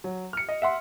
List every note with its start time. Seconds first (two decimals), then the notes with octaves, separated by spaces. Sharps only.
0.04 F#3
0.33 F6 C#7
0.49 D#5
0.62 E5 F#5 C6